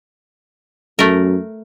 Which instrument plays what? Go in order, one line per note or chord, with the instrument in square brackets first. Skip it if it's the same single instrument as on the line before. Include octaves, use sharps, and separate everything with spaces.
[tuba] F#2 [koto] A3 A#4